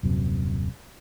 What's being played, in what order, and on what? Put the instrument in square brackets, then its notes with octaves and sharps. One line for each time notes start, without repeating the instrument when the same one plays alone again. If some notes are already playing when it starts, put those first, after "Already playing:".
[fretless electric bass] D#1 F#2 C3